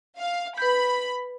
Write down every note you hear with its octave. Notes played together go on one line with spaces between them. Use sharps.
F5
B4 B5 G6